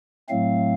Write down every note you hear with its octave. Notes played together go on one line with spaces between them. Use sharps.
A2 F#3 A3 C4 F5